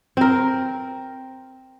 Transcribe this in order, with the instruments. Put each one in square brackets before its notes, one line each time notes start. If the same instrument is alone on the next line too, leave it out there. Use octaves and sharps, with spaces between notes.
[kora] C4 A#4